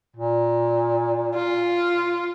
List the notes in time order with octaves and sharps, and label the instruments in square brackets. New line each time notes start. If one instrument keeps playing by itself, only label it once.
[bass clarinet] A#2
[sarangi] F4